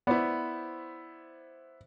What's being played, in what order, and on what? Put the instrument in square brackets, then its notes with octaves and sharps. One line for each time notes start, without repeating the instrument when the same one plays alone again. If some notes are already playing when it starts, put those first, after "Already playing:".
[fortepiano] B3 [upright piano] E4 C5 D5